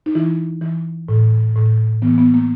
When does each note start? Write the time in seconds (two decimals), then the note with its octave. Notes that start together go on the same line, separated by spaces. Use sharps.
0.06 D#4
0.15 E3 E4
0.62 E3
1.09 A2
1.55 A2
2.02 E3 B3
2.11 A#3
2.18 B3
2.34 A#3